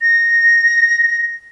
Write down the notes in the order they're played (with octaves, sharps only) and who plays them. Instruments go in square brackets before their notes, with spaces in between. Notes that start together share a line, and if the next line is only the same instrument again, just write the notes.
[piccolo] A#6